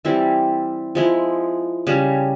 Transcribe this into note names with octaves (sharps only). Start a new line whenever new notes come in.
E3 G3 C4 E4
F3 G#3 E4
C#3 G3 C#4